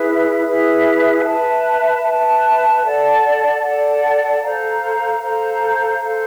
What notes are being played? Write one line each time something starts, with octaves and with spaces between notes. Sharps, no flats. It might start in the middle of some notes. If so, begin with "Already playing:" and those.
Already playing: E4 G#4 B4 E5
E4 G#4 B4 E5
B4 E5 A5
B4 E5 A5
A4 D5 F#5 A5
A4 D5 F#5 A5
A4 C5 F5 A#5
A4 C5 F5 A#5
A4 C5 F5